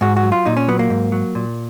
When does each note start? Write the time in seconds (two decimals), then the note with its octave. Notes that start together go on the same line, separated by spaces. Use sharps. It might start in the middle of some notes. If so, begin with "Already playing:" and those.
0.01 G#2 F#4
0.16 F#4
0.23 F#3
0.32 F4
0.46 A#2 D#4
0.57 C#4
0.68 F#3 B3
0.79 A#3
0.90 G#2
1.12 F#3
1.35 A#2